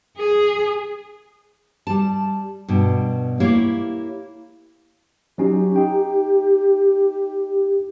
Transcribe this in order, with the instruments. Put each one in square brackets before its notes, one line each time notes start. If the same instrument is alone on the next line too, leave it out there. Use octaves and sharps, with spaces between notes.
[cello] G#4
[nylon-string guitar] G3 A5
G2 B2
A#3 E4 G4 C#5 F5
[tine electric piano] F#3 C#4 D#4 [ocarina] G4
[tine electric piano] D#4 G5